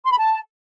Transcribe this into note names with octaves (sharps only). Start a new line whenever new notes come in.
C6
B5
A5